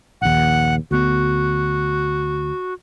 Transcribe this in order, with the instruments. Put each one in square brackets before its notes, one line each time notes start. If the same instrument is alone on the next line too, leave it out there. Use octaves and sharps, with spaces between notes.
[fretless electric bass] A#1 D#2 [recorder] F#5
[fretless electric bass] D2 B3 [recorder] F#4